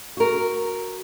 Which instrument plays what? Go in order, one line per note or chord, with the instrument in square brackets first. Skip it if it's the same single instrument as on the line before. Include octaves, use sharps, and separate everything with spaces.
[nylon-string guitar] F#4 A#4